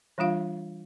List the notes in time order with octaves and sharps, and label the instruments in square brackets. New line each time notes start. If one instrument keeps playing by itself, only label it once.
[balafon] E3 G3 D4 F4 F5